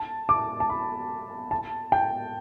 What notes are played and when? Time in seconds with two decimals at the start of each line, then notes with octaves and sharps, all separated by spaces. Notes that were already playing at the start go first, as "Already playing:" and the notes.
Already playing: A5
0.29 D6
0.60 A5
0.70 B5
1.51 A5
1.92 G5